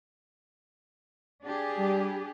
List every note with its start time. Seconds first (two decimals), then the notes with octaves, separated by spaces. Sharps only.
1.44 D4 G4 G#4
1.78 G3